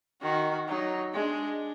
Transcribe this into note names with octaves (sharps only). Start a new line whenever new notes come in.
D#3 F#4
F#3 D#4
G#3 D4